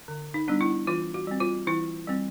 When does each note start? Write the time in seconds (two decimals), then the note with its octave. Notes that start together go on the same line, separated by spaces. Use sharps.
0.08 D3
0.34 D#4
0.48 G3 B3 D4
0.61 E4
0.87 E3 F4
1.14 F#4
1.27 G3 C4
1.40 F4
1.67 E3 E4
2.07 G3 C4